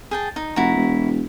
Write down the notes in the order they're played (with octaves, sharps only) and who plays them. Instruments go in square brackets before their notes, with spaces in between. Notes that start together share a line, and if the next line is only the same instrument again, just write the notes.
[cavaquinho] G#4 G5 A5
D#4
[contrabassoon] F1 [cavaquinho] E4 F#4 A#5
[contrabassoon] E1